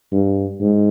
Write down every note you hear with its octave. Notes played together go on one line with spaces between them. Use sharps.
G2
G#2